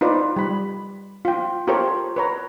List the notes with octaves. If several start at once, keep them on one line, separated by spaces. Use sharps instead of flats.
D#4 F4 B4 C5 D5
G3 B5
F4 G5
F4 G4 A4 A#4 C5 C#5
B4 C#5 A#5